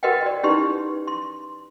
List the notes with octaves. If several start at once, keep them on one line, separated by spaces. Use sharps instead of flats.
F#4 A#4 B4 D#5 F#5 G5
F#4 D5
C#4 D#4 E4 G4 B4 C6
C6